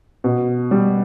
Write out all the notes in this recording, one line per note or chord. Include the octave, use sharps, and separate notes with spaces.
B2
G3